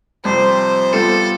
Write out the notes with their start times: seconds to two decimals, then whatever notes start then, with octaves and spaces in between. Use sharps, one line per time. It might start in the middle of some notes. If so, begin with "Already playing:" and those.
0.25 F2 C3 G3 C5
0.93 G3 B3 F4 A4